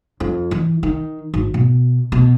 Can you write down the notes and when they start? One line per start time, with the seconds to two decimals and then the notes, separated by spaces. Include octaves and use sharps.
0.20 F2
0.51 E3
0.83 D#3
1.34 G#1
1.54 B2
2.12 B2